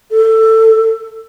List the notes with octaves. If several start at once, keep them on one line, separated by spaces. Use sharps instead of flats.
A4